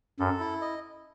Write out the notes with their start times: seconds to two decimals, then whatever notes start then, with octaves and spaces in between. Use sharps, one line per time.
0.19 F#2 A4
0.40 E4
0.61 D#5